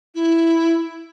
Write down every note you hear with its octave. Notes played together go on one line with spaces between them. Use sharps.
E4